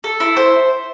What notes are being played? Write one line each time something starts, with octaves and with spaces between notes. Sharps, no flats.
A4
E4
C5